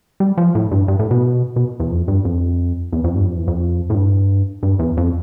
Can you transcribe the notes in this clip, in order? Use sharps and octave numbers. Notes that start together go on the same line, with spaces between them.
G3
F3
A2
G2
G2
A2
B2
B2
E2
F2
G2
F2
E2
F2
G2
F2
E2
F2
A2
G2
G2
E2
F2